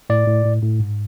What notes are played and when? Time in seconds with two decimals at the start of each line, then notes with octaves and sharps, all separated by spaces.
0.10 A2 D5
0.27 A2
0.45 A2
0.62 A2
0.80 G#2